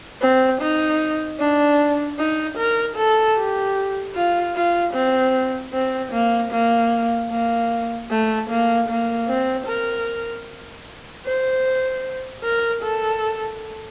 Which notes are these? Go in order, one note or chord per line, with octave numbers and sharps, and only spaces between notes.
C4
D#4
D4
D#4
A#4
A4
G4
F4
F4
C4
C4
A#3
A#3
A#3
A3
A#3
A#3
C4
A#4
C5
A#4
A4